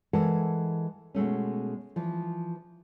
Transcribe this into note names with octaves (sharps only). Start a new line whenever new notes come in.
E3 G#3 A4 A#4 F#5 A5
B2 G#3 A3 C#4
E3 F3